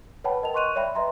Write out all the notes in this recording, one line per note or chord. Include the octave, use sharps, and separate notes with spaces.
B4 C#5 F#5 G5 A5 B5
A#4 D#5 A5 F7
C6 C#6 F#6 D#7 F7
C#5 D5 E5 G5 B5
B4 D#5 E5 A#5 C6